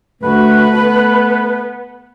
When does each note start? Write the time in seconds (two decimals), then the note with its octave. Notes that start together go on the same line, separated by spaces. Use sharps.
0.22 D2 A3 F#4 B4
0.77 B3